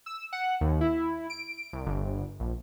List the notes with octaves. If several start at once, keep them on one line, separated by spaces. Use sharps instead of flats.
E6
F#5
D#2
E4
D7
C2
G1
A#1